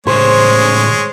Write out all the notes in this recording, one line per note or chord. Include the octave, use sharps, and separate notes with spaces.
A2 C#3 G#3 C5 C#5